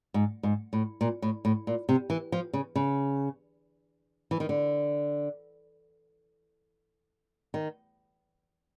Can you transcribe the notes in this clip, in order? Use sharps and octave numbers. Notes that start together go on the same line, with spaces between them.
G#2
G#2
A2
A#2
A2
A2
A#2
C3
E3
F3
C#3
C#3
E3
D#3
D3
D#3